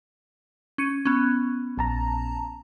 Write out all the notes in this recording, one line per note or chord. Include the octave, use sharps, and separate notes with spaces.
C#4 C#7 D#7
B3 C#4
A#1 A5 A#5